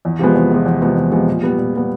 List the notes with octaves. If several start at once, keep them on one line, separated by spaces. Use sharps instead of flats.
E2
C3 F3 G#3 B3
E2
C3 F3 G#3 B3
E2
C3 F3 G#3 B3
E2
C3 F3 G#3 B3
A#2
G3 B3
A#2
G3 B3